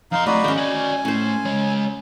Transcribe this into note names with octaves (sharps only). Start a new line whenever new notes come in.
F2 D#4 F5 C6
A3 C4 F#4 D5 D#5 B5
D#3 C#4 G#4 G5
F#4 D5 G#5
A3 C#4 E4 C5
G#3 C#5